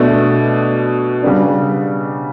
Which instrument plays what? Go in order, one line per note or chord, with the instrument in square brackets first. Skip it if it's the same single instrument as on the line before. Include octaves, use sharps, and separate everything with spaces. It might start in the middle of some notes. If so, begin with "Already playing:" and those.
Already playing: [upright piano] B2 A3 D4
C#3 G3 B3 D4